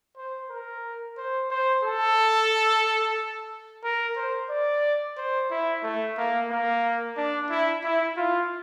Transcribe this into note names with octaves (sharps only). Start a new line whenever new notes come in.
C5
A#4
C5
C5
A4
A#4
C5
D5
C5
E4
A3
A#3
A#3
D4
E4
E4
F4